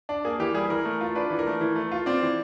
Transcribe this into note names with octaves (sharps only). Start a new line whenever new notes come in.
D4
A#3 G#4
E3 G4
G3 G#4
E3 A#4
A3
F4
D4 B4
E3
A#4
A3
E3
A3
F4
C4 D5
E3